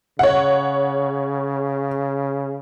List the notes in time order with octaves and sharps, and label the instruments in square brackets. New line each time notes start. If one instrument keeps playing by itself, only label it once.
[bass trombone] C#3 [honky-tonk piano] C#5 F#5